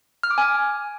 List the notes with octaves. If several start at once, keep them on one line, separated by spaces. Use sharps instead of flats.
F6
D6
G#5